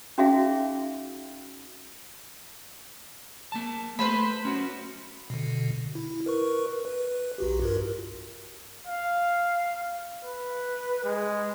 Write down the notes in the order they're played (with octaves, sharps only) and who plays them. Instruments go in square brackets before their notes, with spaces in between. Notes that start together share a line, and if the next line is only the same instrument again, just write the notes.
[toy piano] C#4 D#4 F#4 G#4 E5 F5
[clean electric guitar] A#3 A5
[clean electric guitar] A3 [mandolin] B4 C5 B5
[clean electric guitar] C#4 F#4
[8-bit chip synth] B2 D3
E4
A#4 B4 C#6
B4
B1 F#4 G4
G2 F4 A#4
[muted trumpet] F5
B4
G#3